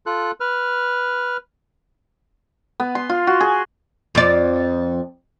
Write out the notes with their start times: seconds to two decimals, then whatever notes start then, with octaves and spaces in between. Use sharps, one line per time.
0.06 F4 A4 F#6
0.40 B4 F6
2.80 B3
2.95 C6
3.09 F4
3.27 F#4
3.41 G#4
4.15 F2 D5